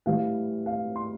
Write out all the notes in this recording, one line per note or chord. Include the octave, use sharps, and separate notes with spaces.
A2 E3 G3 F5
F5
C6